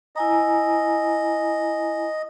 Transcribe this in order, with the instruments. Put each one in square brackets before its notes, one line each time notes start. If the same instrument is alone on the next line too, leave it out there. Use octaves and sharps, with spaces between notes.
[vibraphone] E4 G#5 A#5 [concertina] D#5